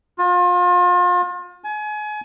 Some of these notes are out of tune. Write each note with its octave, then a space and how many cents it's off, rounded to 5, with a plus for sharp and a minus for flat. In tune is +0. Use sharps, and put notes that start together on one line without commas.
F4 +35
G#5 +30